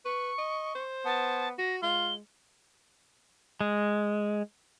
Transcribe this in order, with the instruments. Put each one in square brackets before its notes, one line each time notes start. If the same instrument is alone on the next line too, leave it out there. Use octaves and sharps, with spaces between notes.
[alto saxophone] B4 [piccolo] C#6
[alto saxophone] D#5
C5
[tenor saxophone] B3 [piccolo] A5
[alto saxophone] F#4 [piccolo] A#6
[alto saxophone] G#3 [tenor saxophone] F4 [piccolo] G7
[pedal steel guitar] G#3